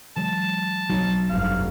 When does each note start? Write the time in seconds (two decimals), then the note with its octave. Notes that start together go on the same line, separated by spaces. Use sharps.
0.17 E3 F#3 G#3 A5
0.89 B1 F#3 C4
1.29 F1 G2 F5